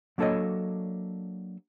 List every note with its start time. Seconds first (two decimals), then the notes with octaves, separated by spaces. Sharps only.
0.18 F#3 A#3 D4 A4 C#5 D#5